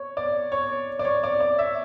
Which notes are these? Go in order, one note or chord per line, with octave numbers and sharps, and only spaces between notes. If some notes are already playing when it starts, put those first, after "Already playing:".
Already playing: C#5
D5
C#5
D5
C#5
D5
D5
E5